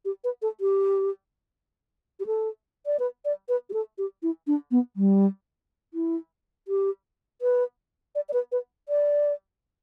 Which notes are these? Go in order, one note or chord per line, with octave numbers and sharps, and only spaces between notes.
G4
B4
A4
G4
G4
A4
D5
B4
D5
B4
G4
A4
G4
E4
D4
B3
G3
E4
G4
B4
D5
D5
B4
B4
D5